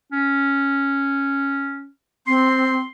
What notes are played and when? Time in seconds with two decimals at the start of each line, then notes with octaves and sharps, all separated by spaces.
0.12 C#4
2.27 C4 C6